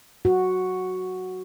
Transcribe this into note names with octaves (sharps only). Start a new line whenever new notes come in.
F#4